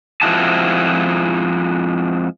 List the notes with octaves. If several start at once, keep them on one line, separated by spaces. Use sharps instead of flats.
F2 F3 G#3 E4 F#4 A5